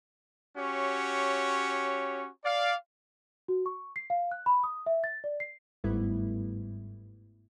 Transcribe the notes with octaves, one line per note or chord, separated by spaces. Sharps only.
C#4 F#4 G4 C#5
D5 F5
F#4
C#6
C7
F5
F#6
B5
D#6
E5
A6
D5
C7
G1 G#2 G3 A3 B3 E4